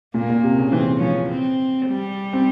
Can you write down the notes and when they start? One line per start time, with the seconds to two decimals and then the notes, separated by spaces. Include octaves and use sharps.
0.14 A#2 A#3
0.29 A#2
0.43 C3
0.58 C#3
0.72 E3 C4
1.01 F3 C#4
1.29 C4
1.87 G3
2.33 C4